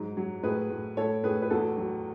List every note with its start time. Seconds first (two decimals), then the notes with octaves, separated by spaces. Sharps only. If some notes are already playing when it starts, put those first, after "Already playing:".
Already playing: G#2 F#3
0.17 F#3
0.43 A2 G#4 B4
0.70 A2
0.97 A2 A4 C#5
1.24 A2 G#4 B4
1.42 B4
1.50 E2 F#4 A4
1.77 F#3